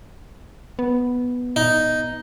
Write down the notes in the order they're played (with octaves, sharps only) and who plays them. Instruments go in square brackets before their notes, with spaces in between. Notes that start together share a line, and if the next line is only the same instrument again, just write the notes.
[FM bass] B3
[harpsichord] D#4